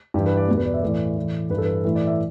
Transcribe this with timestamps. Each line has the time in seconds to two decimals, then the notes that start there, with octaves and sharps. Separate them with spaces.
0.14 G2 E3 G4
0.26 B4
0.37 D5
0.48 E2 B2
0.57 B4
0.65 D5
0.74 E5
0.82 A2 E3 D5
1.17 A2 E3
1.50 G2 B4
1.53 E3 A4
1.65 B4
1.84 A2 E3 E4
1.95 D5
2.07 E5